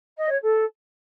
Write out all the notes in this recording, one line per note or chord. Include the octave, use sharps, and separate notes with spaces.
D#5
C#5
A4